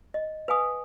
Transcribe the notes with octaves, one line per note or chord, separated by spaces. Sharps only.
D#5
B4 F5 G#5 D#6